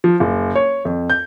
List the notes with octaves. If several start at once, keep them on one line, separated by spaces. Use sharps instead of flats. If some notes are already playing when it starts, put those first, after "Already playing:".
F3
F#1
C#5
F2
G6